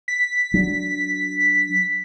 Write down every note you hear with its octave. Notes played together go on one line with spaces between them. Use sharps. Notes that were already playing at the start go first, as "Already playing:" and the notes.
B6
F#3 D4